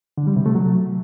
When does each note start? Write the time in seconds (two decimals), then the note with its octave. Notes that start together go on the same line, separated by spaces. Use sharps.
0.18 D3
0.27 G3
0.36 C3
0.46 A3
0.55 F#3